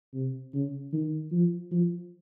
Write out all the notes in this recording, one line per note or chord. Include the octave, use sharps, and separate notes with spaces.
C3
C#3
D#3
F3
F3